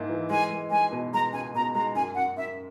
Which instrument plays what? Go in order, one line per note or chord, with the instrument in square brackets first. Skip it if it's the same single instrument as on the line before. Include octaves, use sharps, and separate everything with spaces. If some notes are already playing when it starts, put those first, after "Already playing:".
Already playing: [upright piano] G#2 A#3 E4
E3
[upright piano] G#3 [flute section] G#5
[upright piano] G#3
[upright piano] G#3 [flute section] G#5
[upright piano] B2
[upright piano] G#3 [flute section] A#5
[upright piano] C#2 [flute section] G#5
[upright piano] B2 [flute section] A#5
[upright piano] G#3 [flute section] A#5
[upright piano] F#2 [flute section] G#5
[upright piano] F#2 [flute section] F#5
[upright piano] F#2 [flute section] E5